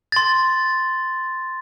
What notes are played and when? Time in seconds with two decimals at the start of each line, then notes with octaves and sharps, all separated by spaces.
0.12 C6 A6